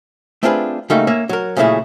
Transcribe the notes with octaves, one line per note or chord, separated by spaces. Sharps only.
A3 C4 D4 F4 G#4 B4
C#3 G3 A3 A#3 D#4 F#4
A#3 C#4 E5
F#3 A#4
A#2 C#3 F#3 A3 E4 G#4